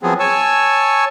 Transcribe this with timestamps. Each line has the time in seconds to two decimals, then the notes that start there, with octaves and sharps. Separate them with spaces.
0.03 F3 F#3 B3 C4 G#4
0.20 C#5 G#5 A5 C#6 E6